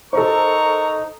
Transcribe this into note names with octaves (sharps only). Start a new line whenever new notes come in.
D#4 A4 A#4 C5 A#5 C#6